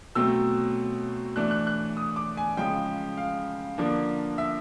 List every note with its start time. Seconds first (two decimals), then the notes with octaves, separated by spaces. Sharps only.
0.15 B2 F#3 A3 C4 E6
1.36 E3 A3 D4 F#6
1.51 F#6
1.67 F#6
1.97 D#6
2.16 D6
2.37 G#5
2.57 C#3 F3 G#3 G5
3.17 F5
3.78 D3 F3 A#3 D4
4.38 E5